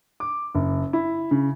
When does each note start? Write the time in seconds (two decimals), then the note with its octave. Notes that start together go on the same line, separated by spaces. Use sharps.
0.20 D6
0.55 F#1
0.93 E4
1.31 C#3